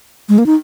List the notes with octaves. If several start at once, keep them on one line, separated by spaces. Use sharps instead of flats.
G#3
A#3
D#4